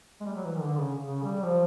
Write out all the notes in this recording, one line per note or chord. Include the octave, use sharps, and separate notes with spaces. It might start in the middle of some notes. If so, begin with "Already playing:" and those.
G#3
G3
F#3
E3
D#3
D3
C#3
C#3
G3
F3